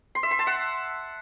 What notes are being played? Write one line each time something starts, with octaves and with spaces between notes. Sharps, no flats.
C6
E5
C6
A5
F#5